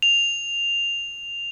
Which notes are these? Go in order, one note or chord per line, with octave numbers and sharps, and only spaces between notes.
F7